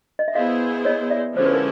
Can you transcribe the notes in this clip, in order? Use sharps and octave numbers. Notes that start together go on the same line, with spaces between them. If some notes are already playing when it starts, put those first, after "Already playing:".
D#5
E5
B3 E4 G#4 C5 D#5 F5
C#5 D#5
D5 E5
D3 F3 G#3 C#4 E4 C5
B4
A#4